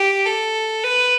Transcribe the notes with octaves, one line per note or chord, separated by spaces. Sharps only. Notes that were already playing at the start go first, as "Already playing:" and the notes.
Already playing: G4
A4
B4